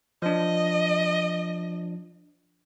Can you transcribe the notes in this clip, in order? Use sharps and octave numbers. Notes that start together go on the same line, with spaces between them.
F3 D4 D#5